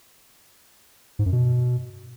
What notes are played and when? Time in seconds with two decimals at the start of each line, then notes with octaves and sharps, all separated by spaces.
1.19 G#2
1.26 F#2
1.33 B2